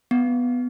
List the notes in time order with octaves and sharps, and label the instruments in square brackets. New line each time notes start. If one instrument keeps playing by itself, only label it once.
[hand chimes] B3